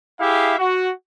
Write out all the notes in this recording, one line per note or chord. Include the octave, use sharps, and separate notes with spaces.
E4 G4 G#4 E5 F5
F#4